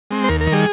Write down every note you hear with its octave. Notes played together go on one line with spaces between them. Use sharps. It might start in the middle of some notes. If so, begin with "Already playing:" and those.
G#3 C4
C5
D#2 A#4
A#4
D#3
G3 G#4